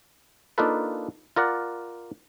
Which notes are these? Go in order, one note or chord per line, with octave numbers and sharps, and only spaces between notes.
A#3 D4 D#4 F4 A4 B4
F4 A#4 D5 F#5